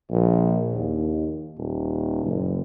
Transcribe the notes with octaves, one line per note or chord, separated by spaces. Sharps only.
A#1
D#2
D#1
F#1